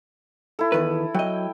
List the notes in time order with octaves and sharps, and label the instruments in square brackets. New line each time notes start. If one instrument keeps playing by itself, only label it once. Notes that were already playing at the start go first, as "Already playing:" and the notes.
[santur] E4 A4
[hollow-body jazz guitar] E2 D#3 B4
[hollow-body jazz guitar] F#3 D#5 [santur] G5